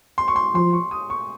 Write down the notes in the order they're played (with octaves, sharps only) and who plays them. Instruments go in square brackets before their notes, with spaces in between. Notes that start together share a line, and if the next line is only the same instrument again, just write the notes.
[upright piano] C6
C#6
C6
[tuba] F3 [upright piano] C6
[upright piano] C#6
D#6
C#6